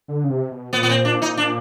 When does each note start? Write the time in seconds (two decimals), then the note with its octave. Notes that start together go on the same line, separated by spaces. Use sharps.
0.08 D3
0.24 C#3
0.30 C3
0.52 B2
0.72 A#2 B3
0.83 B3
0.89 C4
1.05 D4
1.22 D#4
1.37 D4